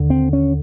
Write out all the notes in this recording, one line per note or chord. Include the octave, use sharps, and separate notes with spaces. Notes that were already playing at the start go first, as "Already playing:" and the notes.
Already playing: D#2 D3
C4
C#4